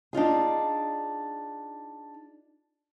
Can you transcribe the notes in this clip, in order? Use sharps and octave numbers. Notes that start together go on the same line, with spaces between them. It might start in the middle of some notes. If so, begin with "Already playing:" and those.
D4 D#4 F4 G#4